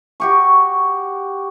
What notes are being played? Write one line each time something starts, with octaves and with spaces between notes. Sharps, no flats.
F#4 G4 C#6